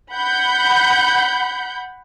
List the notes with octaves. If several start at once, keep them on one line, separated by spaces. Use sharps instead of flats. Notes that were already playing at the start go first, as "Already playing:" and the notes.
F#5 B5 G6